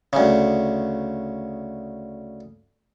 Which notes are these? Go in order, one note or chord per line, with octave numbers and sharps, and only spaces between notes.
D2 C#3